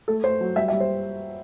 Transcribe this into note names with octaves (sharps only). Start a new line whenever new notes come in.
A3 A4
A3 C5
F#3
G3 E5
E5
G3
C5